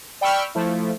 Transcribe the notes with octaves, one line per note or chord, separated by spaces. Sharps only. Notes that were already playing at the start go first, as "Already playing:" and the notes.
D5 G5 B5 C#6 E6 F6
F3 A3 E4